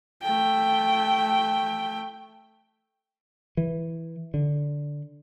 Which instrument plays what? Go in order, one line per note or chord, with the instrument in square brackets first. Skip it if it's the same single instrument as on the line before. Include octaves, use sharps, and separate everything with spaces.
[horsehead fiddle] A3 G5
[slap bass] E3
D3